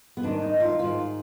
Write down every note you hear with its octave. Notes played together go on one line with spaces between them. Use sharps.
B3
G#2 D#3 D4
D#4
F4
G#2 D#3 F4